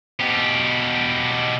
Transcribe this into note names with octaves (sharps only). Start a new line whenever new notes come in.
B2 G4